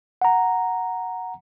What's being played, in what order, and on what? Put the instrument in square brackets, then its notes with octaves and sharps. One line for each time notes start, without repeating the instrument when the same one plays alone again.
[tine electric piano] F#5 A#5